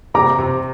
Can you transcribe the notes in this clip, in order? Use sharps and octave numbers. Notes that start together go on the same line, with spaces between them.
C3 A#5 D6
C3